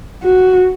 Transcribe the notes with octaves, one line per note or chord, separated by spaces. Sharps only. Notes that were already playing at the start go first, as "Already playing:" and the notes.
F#4